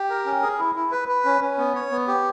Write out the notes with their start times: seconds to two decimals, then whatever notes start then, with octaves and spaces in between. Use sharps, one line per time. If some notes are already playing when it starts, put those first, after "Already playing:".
Already playing: G4
0.10 A#4
0.26 C#4
0.42 G#4
0.59 E4
0.75 E4
0.92 B4
1.08 B4
1.25 C#4
1.42 C#4
1.58 B3
1.75 C#5
1.91 B3
2.08 G4